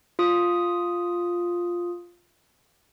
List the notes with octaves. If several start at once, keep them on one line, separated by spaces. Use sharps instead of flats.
F4 D#6